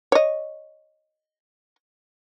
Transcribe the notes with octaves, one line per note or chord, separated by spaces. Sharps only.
C#5 D#5